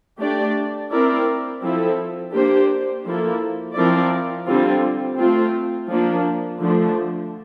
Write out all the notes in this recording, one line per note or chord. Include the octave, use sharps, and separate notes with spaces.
A3 D4 G4 D5
C4 E4 A#4 D5
F3 C4 E4 A4
A#3 D4 G4 C5
F3 A#3 E4 A4
F3 C4 E4 A#4 D5
D3 G3 C4 F4
A3 C4 F4
F3 A#3 D4
D3 F3 A3 D4